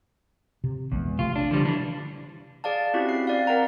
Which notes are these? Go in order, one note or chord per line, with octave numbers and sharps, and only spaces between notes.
C3
A#1 E2 G#3
C3 A3 F4
D4
D3 F3 G3
E3 D4
G#4 D5 F5 A5
C4 C#4 E4 F#4 G4
C7
C4 D5 F5
A#4 F#5 G5 A#5